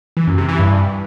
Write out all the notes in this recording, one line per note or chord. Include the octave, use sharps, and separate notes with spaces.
E3
F#2
C3
E3
G2